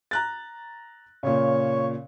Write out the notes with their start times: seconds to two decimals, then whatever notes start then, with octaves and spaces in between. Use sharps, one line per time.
0.11 A#5 F#6 A6
1.23 A#2 C#3 C#5